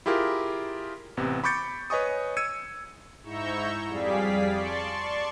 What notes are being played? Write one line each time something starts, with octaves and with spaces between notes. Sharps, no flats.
E4 F4 G4 G#4 A#4
A1 C3 B3
B5 C#6 D6 G6 A6 C#7
B4 C#5 D#5 G#5 C#6 D#6
E6 G#6 C#7 D#7
G#2 E4 A#5 C#6 E6 G6
F2 G3 G#4 D5 F5 B6
D5 A5 C6 C#6